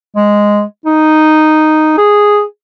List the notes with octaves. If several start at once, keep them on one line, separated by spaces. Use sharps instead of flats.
G#3
D#4
G#4